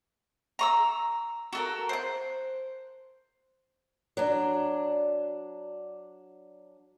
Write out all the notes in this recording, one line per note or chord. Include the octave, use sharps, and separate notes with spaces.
A#5 C#6 E6
F#4 A4 A#4
C5 F#6
F#3 D4